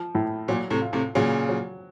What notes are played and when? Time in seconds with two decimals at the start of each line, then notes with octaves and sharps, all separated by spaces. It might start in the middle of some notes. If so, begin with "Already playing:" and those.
Already playing: F3
0.15 A2
0.48 A#2 F#3
0.70 A2 C3
0.82 F4
0.93 A2 C3
1.15 A#2 C#3 F#3
1.49 F#3